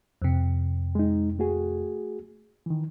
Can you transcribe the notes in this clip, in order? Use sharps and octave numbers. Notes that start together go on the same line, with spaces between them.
F2 C3
G#3 D#4
A3 F#4 G#4
D#3 E3